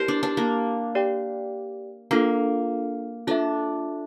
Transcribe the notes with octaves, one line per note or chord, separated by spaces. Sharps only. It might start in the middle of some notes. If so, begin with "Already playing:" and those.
Already playing: E4 G4 A#4 C5 D5
D4
D4
A#3
G4 D5 G5
A#3 D4 F4 A4
D4 F4 A4 E5